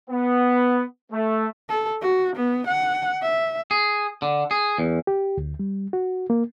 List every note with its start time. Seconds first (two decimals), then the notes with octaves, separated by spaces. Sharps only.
0.10 B3
1.12 A3
1.69 A4
2.02 F#4
2.36 B3
2.67 F#5
3.22 E5
3.71 G#4
4.22 D3
4.51 G#4
4.78 E2
5.07 G4
5.38 D2
5.59 G3
5.93 F#4
6.30 A#3